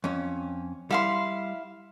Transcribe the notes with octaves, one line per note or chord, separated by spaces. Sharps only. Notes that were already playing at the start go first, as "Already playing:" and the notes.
F2 C#4
G3 E4 F5 C6